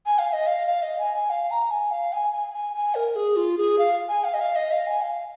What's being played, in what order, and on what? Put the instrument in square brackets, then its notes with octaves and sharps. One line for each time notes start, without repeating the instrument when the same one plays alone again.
[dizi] G#5
F5
D#5
F5
F5
D#5
G#5
G#5
F5
A#5
G#5
F5
G#5
G#5
G#5
G#5
A#4
G#4
F4
G#4
F5
G#5
F5
D#5
F5
D#5
F5
G#5
F5